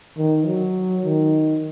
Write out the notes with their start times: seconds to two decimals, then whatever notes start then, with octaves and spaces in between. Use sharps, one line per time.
0.17 D#3
0.46 F#3
1.04 D#3